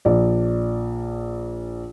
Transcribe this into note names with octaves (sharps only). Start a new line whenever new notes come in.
A#1 D5